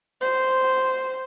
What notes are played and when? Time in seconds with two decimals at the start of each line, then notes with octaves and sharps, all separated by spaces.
0.21 C5